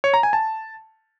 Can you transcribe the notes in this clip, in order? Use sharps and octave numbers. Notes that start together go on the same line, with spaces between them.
C#5
A#5
G#5
A5